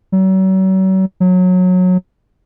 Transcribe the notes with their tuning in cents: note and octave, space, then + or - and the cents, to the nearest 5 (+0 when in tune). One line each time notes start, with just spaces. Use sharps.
F#3 +40
F#3 -20